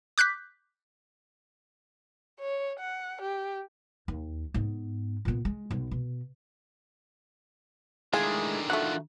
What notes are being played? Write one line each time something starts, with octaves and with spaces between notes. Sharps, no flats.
D6 F#6 G6 B6
C#5
F#5
G4
D#2
G#2 B3
A#2 B3
G#3
B1
B2
D3 D#3 G#3 A3 E4 F4 G#4
F#3 A3 F4 F#5